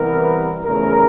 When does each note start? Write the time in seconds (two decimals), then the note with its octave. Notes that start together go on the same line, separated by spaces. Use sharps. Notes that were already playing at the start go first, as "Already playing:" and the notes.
Already playing: C3 E3 G3 B3 A#4
0.64 E2 C#3 F3 A3 A#4